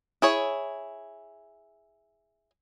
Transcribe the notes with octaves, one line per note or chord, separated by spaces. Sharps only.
E4 G#4 C#5